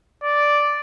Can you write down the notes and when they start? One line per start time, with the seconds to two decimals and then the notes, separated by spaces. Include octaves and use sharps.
0.23 D5